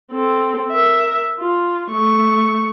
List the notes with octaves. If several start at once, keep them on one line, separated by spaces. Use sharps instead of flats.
C4 A4
A#4 E5
F4
A3 C#6